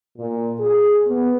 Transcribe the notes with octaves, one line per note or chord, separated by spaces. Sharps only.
A#2
G#4
B3